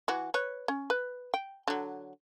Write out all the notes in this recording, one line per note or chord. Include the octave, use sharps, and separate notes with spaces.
E3 F#4
B4 C#5
C#4
B4
G5
D3 F#3